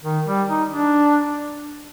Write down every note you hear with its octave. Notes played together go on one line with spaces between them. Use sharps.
D#3
G3
D#4
D4